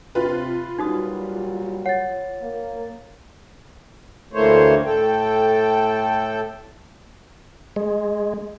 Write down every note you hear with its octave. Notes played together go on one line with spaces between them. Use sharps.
C3 F4 B4
A#2 F#3 G3 D#4 F#4 D#6
C#5 F#5 A6
A#3
D2 E3 A3 A#3 C5 C#5
A2 A4 G5
G#3